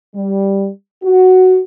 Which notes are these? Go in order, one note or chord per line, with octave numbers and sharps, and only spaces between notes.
G3
F#4